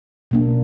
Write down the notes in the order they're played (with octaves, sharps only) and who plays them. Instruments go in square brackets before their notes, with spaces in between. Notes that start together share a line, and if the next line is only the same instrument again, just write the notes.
[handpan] B2 A#3 D4